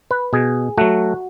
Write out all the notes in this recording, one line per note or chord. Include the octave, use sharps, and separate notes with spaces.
B4
B2 G#4
F#3 A3 F#4